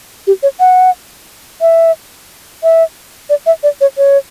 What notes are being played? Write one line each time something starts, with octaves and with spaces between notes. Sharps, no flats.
G4
C#5
F#5
E5
E5
D5
E5
D5
C#5
C#5